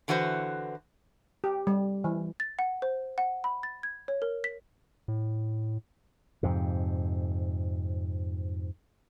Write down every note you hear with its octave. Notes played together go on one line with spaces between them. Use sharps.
D3 E3 F#4 B4 C5
G4
G3
E3
A6
F#5
C5
F#5
B5
A6
G#6
C#5
A#4
B6
A2
F2 G#2 C3